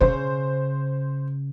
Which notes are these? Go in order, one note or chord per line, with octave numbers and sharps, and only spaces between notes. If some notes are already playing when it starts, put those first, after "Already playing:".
C#3 C5